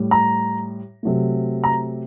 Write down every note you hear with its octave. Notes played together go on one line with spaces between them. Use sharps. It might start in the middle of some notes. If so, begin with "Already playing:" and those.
Already playing: A2 G3
A#5
C3 F#3 A3
A#5